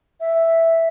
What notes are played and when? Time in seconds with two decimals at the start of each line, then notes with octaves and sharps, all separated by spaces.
0.20 E5